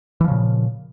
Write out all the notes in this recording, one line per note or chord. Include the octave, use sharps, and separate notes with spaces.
A#2 C#3 E3 F3